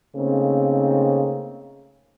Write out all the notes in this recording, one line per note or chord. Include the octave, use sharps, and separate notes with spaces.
C#3 A3 A#3 C4 D#4